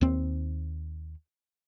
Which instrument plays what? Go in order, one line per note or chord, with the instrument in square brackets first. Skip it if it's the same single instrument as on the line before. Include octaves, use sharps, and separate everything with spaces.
[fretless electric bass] D#2 C4